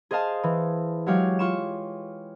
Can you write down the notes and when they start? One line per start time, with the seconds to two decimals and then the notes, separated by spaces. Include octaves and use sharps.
0.11 G#4 C5 D#5 F5 A5
0.43 E3
1.06 F#3 G#3 F#4 G4 C#5 F5
1.39 F4 C#6 E7